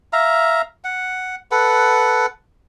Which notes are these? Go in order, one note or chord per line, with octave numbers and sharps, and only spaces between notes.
E5 F5 A#5
F#5
A4 B4 F#5